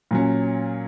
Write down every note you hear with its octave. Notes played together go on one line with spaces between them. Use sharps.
A#2 F#3 C#4